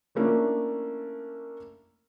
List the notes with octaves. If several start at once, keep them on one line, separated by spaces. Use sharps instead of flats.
F3 A3 A#3 C#4 D4 E4